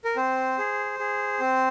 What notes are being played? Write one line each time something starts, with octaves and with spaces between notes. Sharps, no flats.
A#4
C4 C5
G#4
G#4
C4